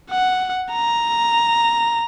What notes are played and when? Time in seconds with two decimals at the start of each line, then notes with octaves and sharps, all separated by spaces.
0.10 F#5
0.72 A#5